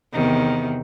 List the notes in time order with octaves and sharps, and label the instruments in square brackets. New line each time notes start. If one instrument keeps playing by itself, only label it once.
[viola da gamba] E2 C3 D#3